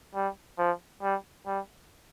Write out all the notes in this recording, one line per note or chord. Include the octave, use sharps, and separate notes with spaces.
G3
F3
G3
G3